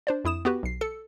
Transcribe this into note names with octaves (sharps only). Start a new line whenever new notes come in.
D4 C5 D5
F2 E4 D#6 E7
B3 F#4 G4 B4
B1 C7
A4 C#7